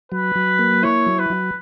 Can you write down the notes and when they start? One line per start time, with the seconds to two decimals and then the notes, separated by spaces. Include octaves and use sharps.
0.12 F#3 B4
0.36 F#3
0.59 A#3
0.83 E4 C#5
1.07 F#3
1.19 B4
1.30 F#3